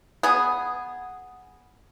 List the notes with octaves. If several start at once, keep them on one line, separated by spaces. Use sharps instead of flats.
B3 G#4